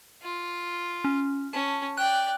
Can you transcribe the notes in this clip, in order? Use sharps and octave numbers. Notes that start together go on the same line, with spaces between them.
F4
C#4
C#4 A5
D5 G5 F#6